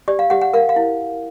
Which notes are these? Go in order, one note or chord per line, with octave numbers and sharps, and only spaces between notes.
G4 D5
F5
G4 F#5
F#5
A#4 F5
F5
E4